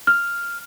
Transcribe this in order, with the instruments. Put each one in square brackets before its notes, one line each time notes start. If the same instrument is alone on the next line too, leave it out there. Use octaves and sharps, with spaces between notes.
[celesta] F6